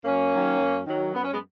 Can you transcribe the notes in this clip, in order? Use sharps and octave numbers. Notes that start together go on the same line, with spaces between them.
F#2 A#3 C#4
D#3 F#3
F#2
D#3 F#3
F#2 B3
C#4
G#3 B3